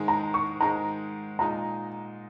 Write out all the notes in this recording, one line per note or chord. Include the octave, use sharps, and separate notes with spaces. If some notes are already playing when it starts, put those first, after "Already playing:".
Already playing: G#2 D#3 G#3
A#5
C#6
G#2 D#3 G#3 A#5
A#2 G#3 D#4 A#5